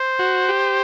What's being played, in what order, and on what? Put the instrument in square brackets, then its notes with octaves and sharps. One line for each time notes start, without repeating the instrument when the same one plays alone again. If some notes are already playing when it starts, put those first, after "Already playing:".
Already playing: [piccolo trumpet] C5
[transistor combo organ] F#4
G4